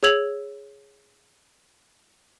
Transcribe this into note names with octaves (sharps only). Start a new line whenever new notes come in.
G#4 C#5 E6 G#6 F7 F#7